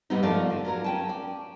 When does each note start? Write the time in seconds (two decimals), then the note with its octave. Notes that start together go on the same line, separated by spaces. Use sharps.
0.10 G#2 C3 G3 B3 C4 D#4
0.23 G#2 F3 A3 A#4 D5
0.50 D3
0.65 F#3 F4 A#4
0.84 C#4 G5 A5
1.09 D5